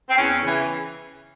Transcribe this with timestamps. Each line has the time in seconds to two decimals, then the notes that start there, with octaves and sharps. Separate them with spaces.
0.09 C4
0.16 E2 C#4
0.43 C#3 E3